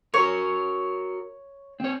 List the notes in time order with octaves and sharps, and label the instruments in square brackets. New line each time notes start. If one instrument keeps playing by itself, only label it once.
[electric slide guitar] F#4 A#4 [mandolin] C#5
[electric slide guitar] C4 C#5